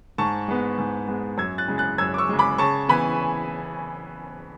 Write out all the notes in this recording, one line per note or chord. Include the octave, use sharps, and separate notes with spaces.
G#2 A5 C#6
G#3 B3
G#2
G#3 B3
F#2 E6 G#6
F#6 A6
C#3 G#3
F#6 A6
F#2 E6 G#6
D6
C#6 E6
C#3 G#3
B5 D6
C#3 A5 C#6
E3 B3 G#5 B5